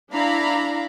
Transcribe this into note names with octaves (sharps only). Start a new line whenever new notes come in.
D4 E4 F5 A#5 B5